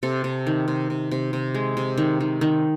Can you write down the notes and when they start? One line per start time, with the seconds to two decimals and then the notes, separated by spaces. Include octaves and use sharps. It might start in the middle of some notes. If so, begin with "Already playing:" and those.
0.03 C3 A4
0.24 C3
0.47 D#3
0.68 C3
0.90 C3
1.11 C3
1.33 C3
1.54 G#3
1.77 C3
1.98 D#3
2.20 D#3
2.41 D#3